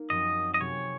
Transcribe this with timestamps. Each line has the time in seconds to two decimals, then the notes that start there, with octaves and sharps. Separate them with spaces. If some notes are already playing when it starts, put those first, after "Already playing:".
Already playing: A#3 D#4
0.10 F#2 F3 C4 D#5
0.54 D#5
0.60 C3 F#3 C#4 G#4 C#5